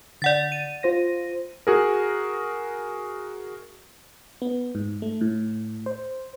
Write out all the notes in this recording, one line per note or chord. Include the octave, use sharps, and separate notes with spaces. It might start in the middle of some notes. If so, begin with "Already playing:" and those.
D3 D5 F#5 A6
D#7
F4 C5 A#6
F#4 G#4 A#4
B3
G#2
A3
A2
C5